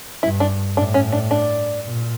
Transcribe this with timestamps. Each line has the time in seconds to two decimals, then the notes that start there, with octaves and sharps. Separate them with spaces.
0.23 G2 E4
0.40 D4
0.77 A2 D4
0.94 C#4
1.12 D4
1.31 D4
1.84 A#2